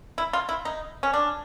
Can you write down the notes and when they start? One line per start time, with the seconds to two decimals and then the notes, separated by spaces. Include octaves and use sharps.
0.18 E4
0.33 F4
0.49 E4
0.65 D#4
1.03 C#4
1.13 D4